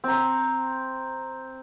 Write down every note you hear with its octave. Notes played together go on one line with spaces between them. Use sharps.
C4 A#5